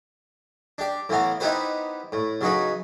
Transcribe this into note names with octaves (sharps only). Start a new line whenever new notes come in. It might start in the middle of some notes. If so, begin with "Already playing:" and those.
D4 G4
A2 E3 B3 F5 A#5
B3 D#4 E4 G4 B4 C5
A2
C#3 F#3 D#4 B4